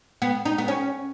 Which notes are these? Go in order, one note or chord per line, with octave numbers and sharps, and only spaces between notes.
B3
D#4
B3
C#4